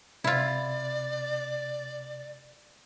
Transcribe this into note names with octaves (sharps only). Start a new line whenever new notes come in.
C3 E4 F4 D5